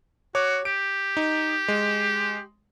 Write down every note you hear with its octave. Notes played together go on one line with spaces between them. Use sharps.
F#4 C#5 D6
G4 D7
D#4
G#3